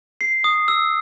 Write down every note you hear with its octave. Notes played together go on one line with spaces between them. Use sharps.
C7
D#6
E6